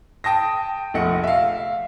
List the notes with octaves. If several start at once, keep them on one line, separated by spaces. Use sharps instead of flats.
G5 A5 D#6 A#6
F1 A#1 A3 F#5 C#7
E5 F5